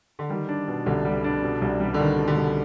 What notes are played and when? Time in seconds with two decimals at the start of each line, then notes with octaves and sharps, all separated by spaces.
0.19 D3
0.30 D#3 G3
0.49 D4
0.68 B2
0.86 C2 D3
1.05 G3
1.24 D4
1.42 B2
1.62 C2
1.80 G3
1.94 D3
1.99 D#3 D4
2.19 B2
2.27 D3
2.36 C2